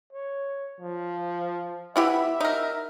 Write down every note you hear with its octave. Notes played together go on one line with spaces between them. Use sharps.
C#5
F3
B3 E4 G4 E5
D#4 A#4